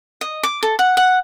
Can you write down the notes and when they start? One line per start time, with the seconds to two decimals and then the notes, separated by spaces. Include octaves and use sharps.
0.21 D#5
0.43 D6
0.63 A4
0.79 F#5
0.97 F#5